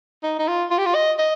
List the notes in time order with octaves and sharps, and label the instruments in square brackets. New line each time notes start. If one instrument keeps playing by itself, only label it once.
[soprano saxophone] D#4
D#4
F4
F4
G4
F4
D#5
D#5